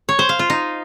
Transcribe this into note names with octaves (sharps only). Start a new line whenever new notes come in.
C#5
C5
F5
F4
D#4